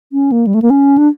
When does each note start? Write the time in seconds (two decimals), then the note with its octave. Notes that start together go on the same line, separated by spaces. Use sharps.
0.13 C#4
0.32 A#3
0.47 G3
0.54 A3
0.62 A#3
0.70 C#4
0.98 D4